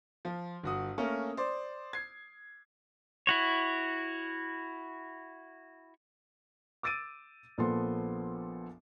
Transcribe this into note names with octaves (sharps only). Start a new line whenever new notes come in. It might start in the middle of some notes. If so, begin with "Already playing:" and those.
F3
G1 F#4 D#6
A3 A#3 C#4 A#4
C5 D5
G#6 C7
E4 F#4 C#5
D6 E6 A6 D7 D#7
A#1 A#2 F3 B3 A4 C6